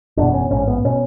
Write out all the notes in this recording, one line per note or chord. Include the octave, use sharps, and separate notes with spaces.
F#1 E2 B2 D4
C#4
A1 G#2 C#4
B3
B2 C#4